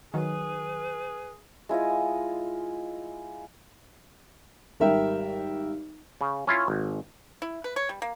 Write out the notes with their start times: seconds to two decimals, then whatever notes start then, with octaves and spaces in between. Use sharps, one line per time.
0.14 D#3 F#3 G#4 B4
1.69 G#3 E4 F4 D#5
4.80 G#1 G3 A#4 E5 G5
6.21 C#3
6.47 C#4 E4 F4 C#5
6.68 G#1
7.42 E4
7.64 B4
7.76 C#5
7.89 G3
8.02 A#3